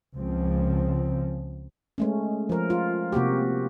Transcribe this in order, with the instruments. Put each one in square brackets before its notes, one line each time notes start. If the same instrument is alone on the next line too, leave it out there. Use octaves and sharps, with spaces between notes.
[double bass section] C#2 C#3 F3 C4
[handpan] G#3 A3 C#4
F3 A#4
F4
C3 A#3 F#4 G4